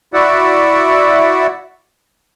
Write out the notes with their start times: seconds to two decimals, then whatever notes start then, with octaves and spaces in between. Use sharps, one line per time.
0.14 E4 F#4 D5 E5 F#5